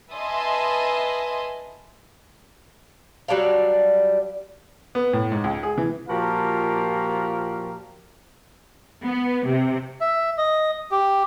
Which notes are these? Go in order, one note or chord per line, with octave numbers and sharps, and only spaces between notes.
B4 D#5 E5 G#5 A5 C6
F#3 G3 D4 F5
B3
A2
G#2
C#2
G#4
E3
A#2 F3 F#4 G4 A#4 F5
B3
C3
E5
D#5
G4